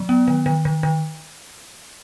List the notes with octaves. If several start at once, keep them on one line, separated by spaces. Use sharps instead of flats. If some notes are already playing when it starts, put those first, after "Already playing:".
Already playing: F#3
B3
D#3
D#3
D#3
D#3